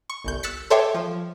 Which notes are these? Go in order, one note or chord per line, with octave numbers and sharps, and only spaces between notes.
C#6
G1 C2 G6
E6 F#6 A6 B6 C#7
A4 C5 C#5 E5 G5 D6
F3